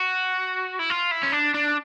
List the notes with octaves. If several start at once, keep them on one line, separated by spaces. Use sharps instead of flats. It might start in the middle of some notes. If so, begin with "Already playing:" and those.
Already playing: F#4
E4
F4
E4
C#4
D4
D4